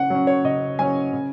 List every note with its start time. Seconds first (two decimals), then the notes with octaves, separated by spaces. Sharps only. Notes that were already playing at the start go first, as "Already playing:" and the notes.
Already playing: C#3 F#5
0.10 F#3 C#4
0.27 C#5
0.44 C#3 D#5
0.79 F#3 C#4 G#5
1.13 C#3